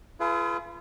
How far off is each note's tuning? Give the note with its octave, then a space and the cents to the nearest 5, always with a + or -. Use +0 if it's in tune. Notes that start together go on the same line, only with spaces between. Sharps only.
F4 -35 G#4 +40 B4 +0